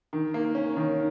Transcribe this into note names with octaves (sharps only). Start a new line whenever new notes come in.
D#3
A#3
C#4
D#3